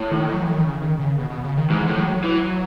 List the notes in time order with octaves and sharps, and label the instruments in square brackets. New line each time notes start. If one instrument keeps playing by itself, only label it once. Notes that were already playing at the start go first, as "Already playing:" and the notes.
Already playing: [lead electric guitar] A2
[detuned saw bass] D#3
F#3
E3
D#3
C#3
D#3
C#3
B2
B2
C#3
D#3
[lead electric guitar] G#2 [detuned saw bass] E3
[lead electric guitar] A2
[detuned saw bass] F#3
[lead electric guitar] E3